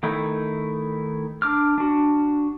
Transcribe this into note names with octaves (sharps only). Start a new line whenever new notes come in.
D#3 A3 D#4 E4
D4 D6 F6
D4 F#4